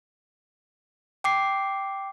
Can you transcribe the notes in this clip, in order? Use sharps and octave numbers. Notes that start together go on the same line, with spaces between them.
G5 D6 C7